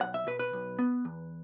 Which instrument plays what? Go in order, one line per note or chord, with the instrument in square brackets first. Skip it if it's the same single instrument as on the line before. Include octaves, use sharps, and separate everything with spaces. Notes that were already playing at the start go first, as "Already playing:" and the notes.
[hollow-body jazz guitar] B1 F#5
E5
B2 B4
B4
B1
B3
E2